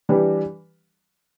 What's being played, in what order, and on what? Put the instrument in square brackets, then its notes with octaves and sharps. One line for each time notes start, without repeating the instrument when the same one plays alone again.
[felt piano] E3 G3 D4 G4 B4